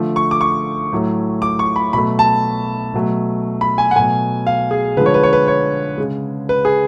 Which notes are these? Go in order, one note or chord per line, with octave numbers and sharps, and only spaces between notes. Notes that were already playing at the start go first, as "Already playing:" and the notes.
Already playing: D3 F3 A3
C#6
D6
C#6
A2 F#3 A3
D6
C#6
B5
B2 F#3 A3 B5
A5
B2 F#3 A3
B5
G#5
F#5
B2 F#3 A3 G#5
F5
G#4
D3 F3 G#3 B4
C#5
B4
C#5
B4
C#5
C#3 G#3
B4
G#4